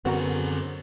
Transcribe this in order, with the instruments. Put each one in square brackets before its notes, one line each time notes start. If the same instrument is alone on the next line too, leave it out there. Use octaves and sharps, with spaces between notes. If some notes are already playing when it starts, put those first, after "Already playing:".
[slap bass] F#2 D3 [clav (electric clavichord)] B3 F#4 A#4 [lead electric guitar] C4 G#4